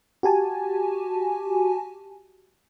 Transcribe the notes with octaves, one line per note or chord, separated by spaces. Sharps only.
F#4 G4 G#5 A5